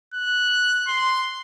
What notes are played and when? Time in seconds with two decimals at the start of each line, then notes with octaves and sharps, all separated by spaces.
0.14 F#6
0.88 C6